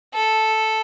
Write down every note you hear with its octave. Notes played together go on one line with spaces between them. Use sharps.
A4